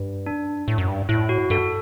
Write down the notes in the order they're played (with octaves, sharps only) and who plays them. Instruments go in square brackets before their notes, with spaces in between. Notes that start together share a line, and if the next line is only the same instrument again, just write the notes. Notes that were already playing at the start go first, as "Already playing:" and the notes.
Already playing: [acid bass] G2
[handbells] D4
[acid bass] A2
F#2
G2
[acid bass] A2 [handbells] E4
[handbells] F#4
[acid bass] G2 [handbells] A4